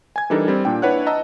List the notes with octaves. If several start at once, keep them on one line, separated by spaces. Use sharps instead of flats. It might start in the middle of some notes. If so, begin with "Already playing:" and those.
G#5 G#6
E3 G3 D4 D#4 A4 A#4
G3 C4
A#2 D4 G5
D4 E4 B4 C#5 F#5 F#6
D#5 F#5 A5 A#5 E6